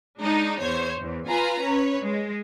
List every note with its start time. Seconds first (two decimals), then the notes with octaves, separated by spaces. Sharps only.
0.20 G#3 D4 D#4
0.60 E2 C5 C#5 G#6
1.00 E2
1.28 F4 B4 G#5 A#5
1.62 C#4 B4 C#5
2.01 G#3